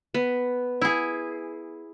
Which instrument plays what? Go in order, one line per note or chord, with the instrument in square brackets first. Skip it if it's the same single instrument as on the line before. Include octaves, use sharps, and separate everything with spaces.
[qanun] B3
[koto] E4 G#4